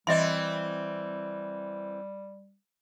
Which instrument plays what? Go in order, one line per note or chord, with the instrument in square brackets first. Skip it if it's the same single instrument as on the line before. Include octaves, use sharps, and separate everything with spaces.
[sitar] E3 C4 [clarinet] G3 [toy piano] D#5 E5 C6